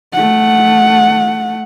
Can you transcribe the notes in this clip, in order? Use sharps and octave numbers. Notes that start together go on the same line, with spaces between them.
A3 F#5